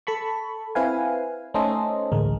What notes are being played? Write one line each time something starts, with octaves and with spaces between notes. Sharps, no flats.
A4 A5 B5 C#6
C4 E4 B4 F5 G#5
A3 C#4 D#4 A4 C5 D#5
A1 D2 G#3 A#4